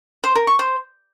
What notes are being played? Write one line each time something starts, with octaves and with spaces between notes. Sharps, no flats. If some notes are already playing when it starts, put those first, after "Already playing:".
C5
A#4
C#6
C5